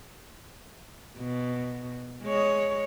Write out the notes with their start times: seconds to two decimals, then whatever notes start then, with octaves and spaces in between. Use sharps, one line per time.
1.18 B2
2.23 G#3 C#5